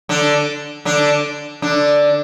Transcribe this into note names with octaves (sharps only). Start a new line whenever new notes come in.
D3 D4
D3 D4
D3 D4